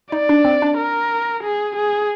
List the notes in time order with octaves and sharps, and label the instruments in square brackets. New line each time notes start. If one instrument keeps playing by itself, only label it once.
[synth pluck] D#4 [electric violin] D5
[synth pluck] D4
C4
D4
[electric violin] A#4
G#4
G#4